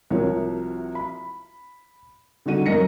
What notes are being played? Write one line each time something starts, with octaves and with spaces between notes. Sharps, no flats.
C2 C3 F3 F#4 A#4 C#5
B5
D3 G3 D#4 F#4 D#7
F#2 A#4 D#5 A#6 C#7